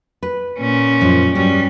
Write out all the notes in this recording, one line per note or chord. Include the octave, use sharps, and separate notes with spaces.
B4
A#2 C#4
F#2 F3 G#3
G2 F#3 G3 C#4